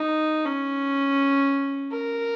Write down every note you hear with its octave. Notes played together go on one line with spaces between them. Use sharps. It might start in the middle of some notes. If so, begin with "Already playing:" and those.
Already playing: D#4
C#4
A#4